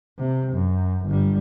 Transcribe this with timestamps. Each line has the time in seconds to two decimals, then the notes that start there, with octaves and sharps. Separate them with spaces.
0.19 C3
0.53 F#2
1.06 G1 G3